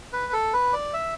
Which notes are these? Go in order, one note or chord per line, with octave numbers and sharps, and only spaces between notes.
B4
A4
B4
D5
E5